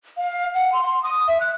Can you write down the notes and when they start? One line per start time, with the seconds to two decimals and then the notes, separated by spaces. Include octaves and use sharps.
0.17 F5
0.55 F#5
0.73 C6
1.03 D#6
1.28 E5
1.40 F#6